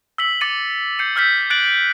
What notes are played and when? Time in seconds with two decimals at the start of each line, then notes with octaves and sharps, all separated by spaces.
0.18 E6 B6 F#7
0.41 D6 A6 C#7 D#7
0.99 G6 C7 C#7 D#7
1.16 E6 F6 G6 B6
1.50 F#6 A6 D7 F#7